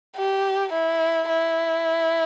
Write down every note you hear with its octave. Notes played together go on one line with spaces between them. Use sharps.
G4
E4
E4